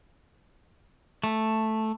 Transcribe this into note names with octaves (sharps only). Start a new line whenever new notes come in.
A3